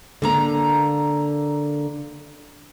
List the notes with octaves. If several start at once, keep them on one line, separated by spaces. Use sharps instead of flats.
D3 A#3 A#5